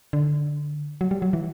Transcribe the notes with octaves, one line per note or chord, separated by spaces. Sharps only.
D3
F#3
G3
F#3
E3